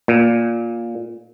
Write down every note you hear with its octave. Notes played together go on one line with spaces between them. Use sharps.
A#2